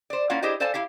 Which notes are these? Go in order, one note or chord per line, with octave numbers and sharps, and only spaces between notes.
C5 D5
A#3 C#4 E4 F4 F5 F#5
D4 E4 G4 G#4 C5 D#5
A4 C5 D5 F5 G#5 A5
E4 G4 F5